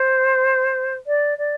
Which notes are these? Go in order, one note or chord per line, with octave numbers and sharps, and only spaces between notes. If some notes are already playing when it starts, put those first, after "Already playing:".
Already playing: C5
D5
D5